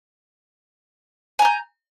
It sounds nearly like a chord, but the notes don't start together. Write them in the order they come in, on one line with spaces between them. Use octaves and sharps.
G#5 A#5 G6